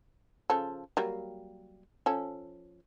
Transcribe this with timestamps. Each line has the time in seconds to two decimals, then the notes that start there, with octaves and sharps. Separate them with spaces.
0.50 C#3 F3 A4
0.97 F#3 G3 A#3
2.06 F3 C#4 A4